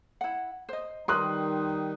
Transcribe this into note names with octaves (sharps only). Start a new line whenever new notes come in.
E4 F#5
C5 D#5
D#3 G3 D#4 A#4 B4 C6 D#6 F#6